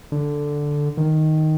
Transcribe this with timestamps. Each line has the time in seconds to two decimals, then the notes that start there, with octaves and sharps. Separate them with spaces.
0.12 D3
0.97 D#3